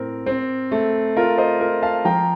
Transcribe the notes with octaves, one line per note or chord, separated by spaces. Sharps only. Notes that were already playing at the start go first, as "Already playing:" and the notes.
Already playing: A2 C4 A#4
C4
A3
F4 A#4
C5 D#5
F4 A#4
F5 A5
F3 G5 A#5